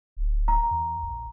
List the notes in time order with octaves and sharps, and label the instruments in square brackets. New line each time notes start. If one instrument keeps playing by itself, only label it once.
[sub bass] D1
[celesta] A#5
[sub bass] E2
A#1